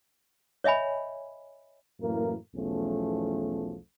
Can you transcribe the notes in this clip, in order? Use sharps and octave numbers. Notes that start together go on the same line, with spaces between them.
C#5 D#5 E5 G#5 B5
F#2 A2 E3 A#3 A#4
B1 E2 F3 A3 C#4